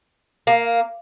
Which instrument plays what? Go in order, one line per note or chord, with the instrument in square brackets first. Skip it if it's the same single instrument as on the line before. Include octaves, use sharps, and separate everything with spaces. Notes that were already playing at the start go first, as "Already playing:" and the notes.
[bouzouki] A#3